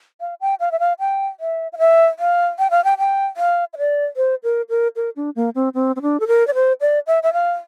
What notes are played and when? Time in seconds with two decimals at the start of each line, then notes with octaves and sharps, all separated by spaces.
0.21 F5
0.41 G5
0.60 F5
0.72 E5
0.80 F5
1.00 G5
1.40 E5
1.73 F5
1.79 E5
2.19 F5
2.59 G5
2.71 F5
2.84 G5
2.98 G5
3.37 F5
3.73 E5
3.77 D5
4.17 C5
4.43 A#4
4.69 A#4
4.96 A#4
5.16 D4
5.36 A#3
5.55 C4
5.74 C4
5.96 C4
6.02 D4
6.20 A4
6.28 A#4
6.47 D5
6.54 C5
6.81 D5
7.07 E5
7.23 E5
7.33 F5